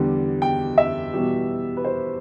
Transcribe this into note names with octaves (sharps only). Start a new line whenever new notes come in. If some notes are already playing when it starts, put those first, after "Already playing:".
Already playing: E2 D3 G3
G5
E5
E2 B2 G3
B4
C5